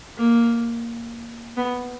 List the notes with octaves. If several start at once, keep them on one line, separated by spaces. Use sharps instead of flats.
A#3
B3